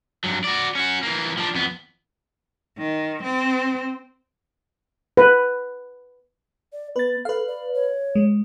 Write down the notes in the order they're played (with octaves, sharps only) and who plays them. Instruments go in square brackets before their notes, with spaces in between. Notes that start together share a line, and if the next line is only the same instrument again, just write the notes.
[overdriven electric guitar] G2 F#3
F#4 D5
C#4 F#4
E3 A#3
F3 D4
F2 B3
[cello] D#3
C4
[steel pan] B4
[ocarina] D5
[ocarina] B3 [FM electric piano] B4 A6
[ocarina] A4 [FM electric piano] B4 F5
[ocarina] D5
C#5
[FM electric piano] G#3